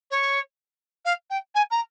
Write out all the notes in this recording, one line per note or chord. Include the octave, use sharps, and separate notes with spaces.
C#5
F5
G5
G#5
A#5